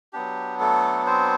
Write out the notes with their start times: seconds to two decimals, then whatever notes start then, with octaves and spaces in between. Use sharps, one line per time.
0.13 F#3 B3 D4 G4
0.60 A3 A4
1.07 C4 C5